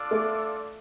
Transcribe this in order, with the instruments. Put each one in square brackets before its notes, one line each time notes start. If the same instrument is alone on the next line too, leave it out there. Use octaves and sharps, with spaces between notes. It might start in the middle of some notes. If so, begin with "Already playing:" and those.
Already playing: [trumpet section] D4 F4 A4 D5
[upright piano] A3